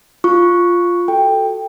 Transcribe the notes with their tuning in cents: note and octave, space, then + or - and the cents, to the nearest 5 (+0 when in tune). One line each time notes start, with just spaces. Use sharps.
F4 +0 C#6 +0
F#4 +0 A4 +0 G5 +10